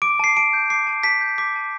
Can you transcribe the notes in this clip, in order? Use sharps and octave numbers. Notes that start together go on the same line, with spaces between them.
D6 D7
A5 C7
A5 D7
G6
D6 C7
A5
A5 B6
G6
D6 B6
A5